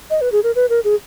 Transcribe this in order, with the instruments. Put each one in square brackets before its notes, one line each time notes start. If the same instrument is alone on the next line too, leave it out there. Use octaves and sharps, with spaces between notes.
[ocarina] D#5
B4
G#4
A#4
B4
A#4
G#4